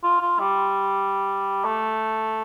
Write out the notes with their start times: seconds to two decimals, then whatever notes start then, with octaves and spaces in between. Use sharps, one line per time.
0.04 F4
0.21 F4
0.39 G3
1.64 A3